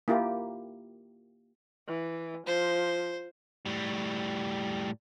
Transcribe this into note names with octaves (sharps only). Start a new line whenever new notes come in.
A#3 E4 F4 G4 A#4
E3
F3 C5
A2 G3